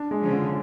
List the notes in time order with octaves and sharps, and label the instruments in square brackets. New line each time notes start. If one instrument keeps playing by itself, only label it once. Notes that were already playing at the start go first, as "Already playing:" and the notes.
Already playing: [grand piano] D4
G#3
[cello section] C#3 F3
[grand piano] D3